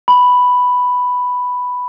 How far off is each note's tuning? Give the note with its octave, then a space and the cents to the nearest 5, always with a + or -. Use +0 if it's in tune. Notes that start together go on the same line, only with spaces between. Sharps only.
B5 +0